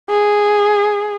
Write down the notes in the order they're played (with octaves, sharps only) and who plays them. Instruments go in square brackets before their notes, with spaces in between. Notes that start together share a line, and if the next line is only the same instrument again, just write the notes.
[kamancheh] G#4